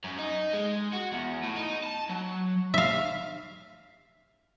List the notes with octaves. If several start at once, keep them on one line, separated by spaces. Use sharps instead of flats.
F#2
D#4
G#3
F#4
E2
A2
D#4
A5
F#3
E5 F5